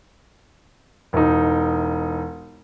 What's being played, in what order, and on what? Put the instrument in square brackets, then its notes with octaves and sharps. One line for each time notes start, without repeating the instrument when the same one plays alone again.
[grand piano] E1 D#4